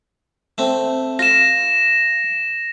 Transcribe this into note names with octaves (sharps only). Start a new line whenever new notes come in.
A3 C4
F4 A#6 E7